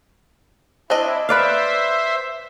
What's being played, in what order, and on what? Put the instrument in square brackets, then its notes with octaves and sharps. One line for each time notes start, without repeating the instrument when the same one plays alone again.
[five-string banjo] C4 D4 D#5 [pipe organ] E4
[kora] B4 D5 F5 [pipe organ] C5 E5